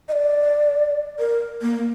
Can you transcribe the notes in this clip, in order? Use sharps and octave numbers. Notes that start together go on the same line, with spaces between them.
D#5
D5
A#4
A#3